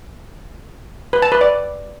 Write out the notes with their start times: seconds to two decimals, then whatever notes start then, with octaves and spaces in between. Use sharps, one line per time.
1.13 B4
1.22 A5
1.32 B4
1.41 D5